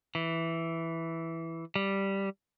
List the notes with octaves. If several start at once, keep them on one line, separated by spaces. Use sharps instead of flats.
E3
G3